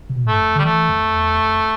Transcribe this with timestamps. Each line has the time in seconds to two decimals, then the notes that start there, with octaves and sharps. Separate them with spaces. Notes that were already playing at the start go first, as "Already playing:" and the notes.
0.09 C3
0.15 B2
0.25 A2
0.28 G2 A3
0.41 F2
0.56 D3 G3
0.65 E3 A3
0.89 F2
1.15 E2
1.39 F2